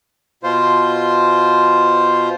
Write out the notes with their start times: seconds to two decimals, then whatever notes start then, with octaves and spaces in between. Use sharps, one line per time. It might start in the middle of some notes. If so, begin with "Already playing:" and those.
0.43 B2 F4 C5